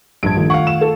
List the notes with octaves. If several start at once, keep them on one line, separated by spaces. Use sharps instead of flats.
A#1 G2 G#6 D7
D#3 A3 F4
F5 F#5 C#6
E7
A4